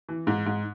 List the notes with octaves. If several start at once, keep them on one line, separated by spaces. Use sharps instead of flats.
E3
G#2
G#2